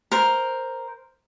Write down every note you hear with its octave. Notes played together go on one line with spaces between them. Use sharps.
A#4 C5